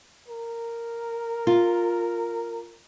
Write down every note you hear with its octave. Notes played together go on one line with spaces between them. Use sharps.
A#4
F4